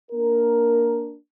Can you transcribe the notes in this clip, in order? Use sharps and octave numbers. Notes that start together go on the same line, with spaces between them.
A#3 D4 A#4